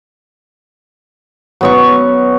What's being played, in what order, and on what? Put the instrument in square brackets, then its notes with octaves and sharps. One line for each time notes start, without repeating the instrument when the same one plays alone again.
[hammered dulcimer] F#3 B3 C#6